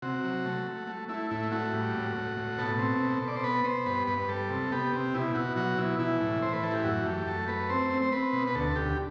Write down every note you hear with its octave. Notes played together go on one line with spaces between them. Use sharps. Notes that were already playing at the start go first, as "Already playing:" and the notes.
C3 F#4
F#3
A3
A3
A3
A3 E4
A2 E4
A3 F#4
G3
A2
A2
A2
B2 A4
C4
B2
B2
D5
C5
B3 B4
B3 C5
G2 B4
G2 B4
G3 A4
C3
B3 G4
C3
B2 E4
B2 F#4
F#3 F#4
B2 E4
E3 E4
A2
A2 C5
B4
E3 A4
G4
F#2 F#4
A3 G4
F#2 A4
A3 B4
C4 C5
C4
C5
C4 B4
B2
B4
D2 A4
D2 G4